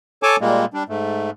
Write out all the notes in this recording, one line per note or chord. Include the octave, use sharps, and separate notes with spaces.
A4 C#5 G#5 A5 D6
A#2 G3 G#3 A#3
G3 D4
G#2 A3